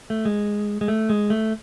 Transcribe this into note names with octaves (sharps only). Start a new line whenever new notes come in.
A3
G#3
G#3
A3
G#3
A3